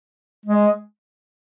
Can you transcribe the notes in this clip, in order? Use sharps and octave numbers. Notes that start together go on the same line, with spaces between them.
G#3